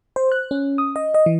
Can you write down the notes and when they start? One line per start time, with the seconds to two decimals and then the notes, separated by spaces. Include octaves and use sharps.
0.16 C5
0.32 F#6
0.51 C#4
0.78 D#6
0.96 D#5
1.14 D#5
1.26 E3